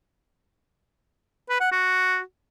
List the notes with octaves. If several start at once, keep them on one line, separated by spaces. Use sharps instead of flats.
B4
F#5
F#4